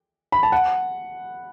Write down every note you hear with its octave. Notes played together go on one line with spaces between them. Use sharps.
B5
A5
F#5